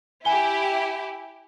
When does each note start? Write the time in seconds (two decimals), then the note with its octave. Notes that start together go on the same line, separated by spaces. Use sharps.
0.25 E4 G4 G#5 G7